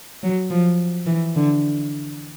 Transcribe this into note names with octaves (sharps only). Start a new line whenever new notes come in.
F#3
F3
E3
D3